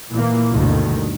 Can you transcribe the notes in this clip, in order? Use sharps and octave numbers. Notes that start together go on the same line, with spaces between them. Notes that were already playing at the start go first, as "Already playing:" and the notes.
A#2 E3 A#3
D2 G2 B2 D#3